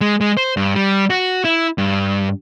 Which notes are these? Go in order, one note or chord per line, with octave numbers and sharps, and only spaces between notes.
G#3
G#3
C5
G2
G3
F#4
E4
G2